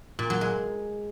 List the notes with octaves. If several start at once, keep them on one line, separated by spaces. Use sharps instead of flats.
A#2
F#3
G#3